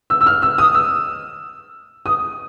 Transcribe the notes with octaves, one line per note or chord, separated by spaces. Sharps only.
E6
E6
F6
E6
D#6
E6
D#6